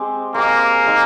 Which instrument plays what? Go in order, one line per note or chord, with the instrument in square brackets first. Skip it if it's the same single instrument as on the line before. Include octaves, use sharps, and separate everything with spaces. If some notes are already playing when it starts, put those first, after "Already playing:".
Already playing: [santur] G#3 C4 G4
[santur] G#3 C4 G4 [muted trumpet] A#3
[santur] G#3 D#4 A#4